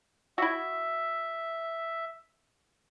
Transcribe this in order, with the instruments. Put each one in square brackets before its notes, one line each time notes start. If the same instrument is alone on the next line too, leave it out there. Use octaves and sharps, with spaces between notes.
[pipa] E4 F#4 [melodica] E5